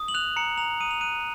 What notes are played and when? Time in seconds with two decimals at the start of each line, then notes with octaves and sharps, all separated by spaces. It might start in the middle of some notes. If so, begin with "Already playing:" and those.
Already playing: D#6
0.08 F#7
0.14 F#6 F7
0.36 A#5 C#7
0.58 A#5 F7
0.80 D#6 D#7
0.91 F7
1.01 F#6 D#7